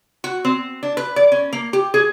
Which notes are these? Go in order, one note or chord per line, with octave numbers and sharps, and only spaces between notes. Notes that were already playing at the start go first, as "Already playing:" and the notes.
F#4
C4
D4
B4
D5
C#4
A#3
G4
G#4